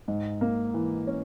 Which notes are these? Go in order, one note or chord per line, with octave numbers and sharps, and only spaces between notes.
G#2
A#3
E3
C#4